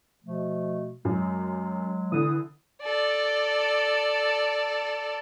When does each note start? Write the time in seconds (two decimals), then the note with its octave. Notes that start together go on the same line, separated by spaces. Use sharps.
0.24 B2 F3 A3
1.05 F#2 F#3 G#3
2.12 D3 E3 D#6
2.83 A4 D5